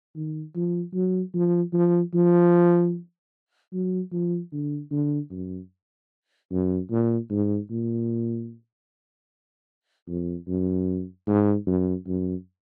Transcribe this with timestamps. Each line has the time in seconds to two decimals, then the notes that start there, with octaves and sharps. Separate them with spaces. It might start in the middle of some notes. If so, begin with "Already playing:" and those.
0.16 D#3
0.55 F3
0.94 F#3
1.34 F3
1.73 F3
2.14 F3
3.73 F#3
4.12 F3
4.52 D3
4.91 D3
5.31 F#2
6.51 F#2
6.90 A#2
7.30 G#2
7.70 A#2
10.07 F2
10.48 F#2
11.27 G#2
11.67 F#2
12.07 F#2